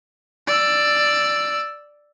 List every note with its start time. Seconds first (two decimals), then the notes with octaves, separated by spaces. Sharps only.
0.47 D5 E6